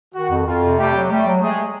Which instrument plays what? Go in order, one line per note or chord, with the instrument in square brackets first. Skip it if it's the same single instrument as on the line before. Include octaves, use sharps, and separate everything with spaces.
[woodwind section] D#3 [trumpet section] F#4
[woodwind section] F2
[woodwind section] F2 [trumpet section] F4
[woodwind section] C3
[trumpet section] G3 G4 [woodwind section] A3
[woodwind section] F#3
[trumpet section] G3 G4 [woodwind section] A3
[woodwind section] F#3
[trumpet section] G#3 G#4 [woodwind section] A3